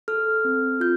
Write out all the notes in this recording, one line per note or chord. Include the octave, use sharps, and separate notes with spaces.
A4 F6
C4
F4 G6